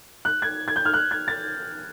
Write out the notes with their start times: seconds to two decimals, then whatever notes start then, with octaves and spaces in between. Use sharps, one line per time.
0.25 F#6
0.42 G#6
0.68 G#6
0.76 G6
0.85 F6
0.94 F#6
1.11 G#6
1.28 A6